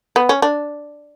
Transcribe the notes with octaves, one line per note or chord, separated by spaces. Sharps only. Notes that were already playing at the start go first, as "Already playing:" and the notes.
B3
C#4
D4